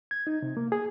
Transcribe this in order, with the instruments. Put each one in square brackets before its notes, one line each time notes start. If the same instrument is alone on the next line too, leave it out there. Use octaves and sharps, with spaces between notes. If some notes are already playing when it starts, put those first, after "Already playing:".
[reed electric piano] G#6
D#4
C3
A#3
G#4